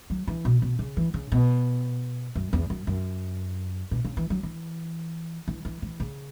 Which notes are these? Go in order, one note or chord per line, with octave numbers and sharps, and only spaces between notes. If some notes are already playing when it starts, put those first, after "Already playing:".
F#3
E3
B2
B2
C#3
E3
C#3
B2
F#2
E2
F#2
F#2
B2
C#3
E3
F#3
E3
E3
E3
E3
C#3